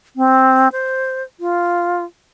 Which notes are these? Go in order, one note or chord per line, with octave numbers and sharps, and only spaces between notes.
C4
C5
F4